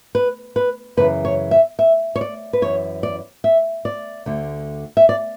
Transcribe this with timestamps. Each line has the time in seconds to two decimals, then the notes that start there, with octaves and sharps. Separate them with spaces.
0.15 B4
0.56 B4
0.97 F#2 C#3 E3 B4
1.25 C#5
1.51 E5
1.79 E5
2.16 C#5
2.21 D5
2.53 B4
2.62 F#2 C#3 E3 C#5
3.03 D5
3.44 E5
3.85 D5
4.26 D2 D3
4.97 E5
5.09 D5